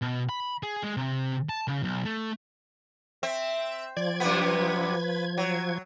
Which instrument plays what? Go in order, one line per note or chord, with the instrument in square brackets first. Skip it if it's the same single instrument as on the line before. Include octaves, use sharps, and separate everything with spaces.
[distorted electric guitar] B2
B5
G#4
G#3
C3
A5
C#3
B1
A3
[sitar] C4 [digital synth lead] E5
[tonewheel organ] F3 G#6 [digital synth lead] D5
[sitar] F#2 C3 B3 [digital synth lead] B4
[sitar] F#3